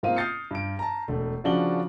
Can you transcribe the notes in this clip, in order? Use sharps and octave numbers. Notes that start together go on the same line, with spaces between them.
G#2 A#3 C4 F4 F5 D#7
D#6 F6 G6 A6 C7 C#7
G2 D7
A5 A#5
E1 A3
C#3 F3 D4 F#4 F#7 G7